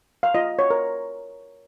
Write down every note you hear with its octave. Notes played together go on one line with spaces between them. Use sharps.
F5
F4 D#5
C#5
A#4